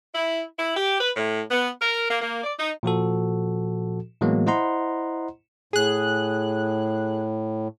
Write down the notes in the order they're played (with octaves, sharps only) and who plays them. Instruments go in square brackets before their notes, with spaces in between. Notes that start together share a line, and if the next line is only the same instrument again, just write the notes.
[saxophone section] E4
E4
G4
B4
A2
B3
A#4
A#3
A#3
D5
D#4
[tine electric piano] A#2 F3 F#4 A4
A2 E3 F#3 G#3 A#3 B3
E4 C5 D#5 F#5 A#5 C6
[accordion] A2 [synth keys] G#4 F#6